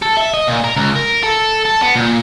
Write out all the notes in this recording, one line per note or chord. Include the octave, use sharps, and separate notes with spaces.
A4
E5
D#5
A#2
A#4
C#2
A#4
A4
A4
B3
A#2